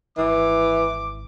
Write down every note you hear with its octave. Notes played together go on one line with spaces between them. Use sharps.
G#1 E3 D6